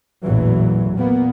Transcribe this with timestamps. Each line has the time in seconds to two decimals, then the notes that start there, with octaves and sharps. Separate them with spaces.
0.24 A1 E2 A#2 E3 F#3
0.94 A#2 A#3 B3